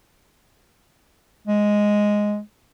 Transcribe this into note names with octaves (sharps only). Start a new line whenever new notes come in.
G#3